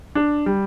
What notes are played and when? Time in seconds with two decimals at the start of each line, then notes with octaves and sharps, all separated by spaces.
0.15 D4
0.46 G3